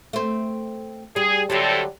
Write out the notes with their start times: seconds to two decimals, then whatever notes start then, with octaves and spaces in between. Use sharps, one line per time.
0.13 A3 C4
1.16 G3 G#4
1.50 A2 D3 F#3 G3 C4 A4